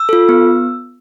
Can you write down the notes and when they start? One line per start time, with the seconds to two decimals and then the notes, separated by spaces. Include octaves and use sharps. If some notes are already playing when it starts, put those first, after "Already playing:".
Already playing: E6
0.09 F4 A4
0.29 B3